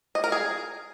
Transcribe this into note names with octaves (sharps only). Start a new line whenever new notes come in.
D#5
A#4
G#4